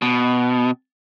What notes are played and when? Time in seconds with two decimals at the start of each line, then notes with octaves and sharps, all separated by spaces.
0.02 B2